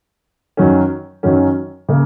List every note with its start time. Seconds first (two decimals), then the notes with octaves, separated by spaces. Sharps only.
0.57 F#2 D#3 F#3 C#4
1.23 F#2 D#3 F#3 C#4
1.89 C#3 A#3